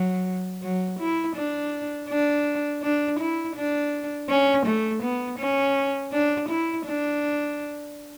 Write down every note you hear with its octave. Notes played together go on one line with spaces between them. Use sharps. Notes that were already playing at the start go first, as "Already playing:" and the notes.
Already playing: F#3
F#3
E4
D4
D4
D4
E4
D4
C#4
A3
B3
C#4
D4
E4
D4